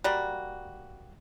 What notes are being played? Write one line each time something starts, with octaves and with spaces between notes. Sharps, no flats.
G3 A#3 F#4